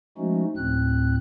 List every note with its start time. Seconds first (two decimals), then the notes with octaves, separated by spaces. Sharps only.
0.18 F3 G#3 A3 C#4 D#4 F#4
0.56 D2 A2 C4 F#6